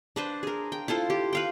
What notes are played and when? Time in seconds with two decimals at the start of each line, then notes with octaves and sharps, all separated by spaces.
0.16 D4 B4 C5
0.43 G#4 A#4
0.72 G5
0.88 E4 F4 A4 C5
1.10 G4
1.33 B4 F5 G5